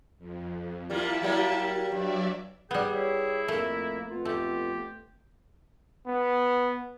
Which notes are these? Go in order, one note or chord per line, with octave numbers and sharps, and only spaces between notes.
F2
G3 A#3 E4 F4 A5
F#3 G3 A#3
G2 F#3 D5 E5
G3 B3 G#4 G5
E4 G4 C#5
F2 A3 A#3 A#4
F2 B3 F4
A3 G4
B3